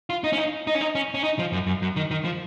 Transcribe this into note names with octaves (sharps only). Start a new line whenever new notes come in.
F4
D#4
C#4
D#4
D#4
C#4
D#4
C#4
C#4
D#4
F3
F#2
F#2
F#2
D#3
D#3
F3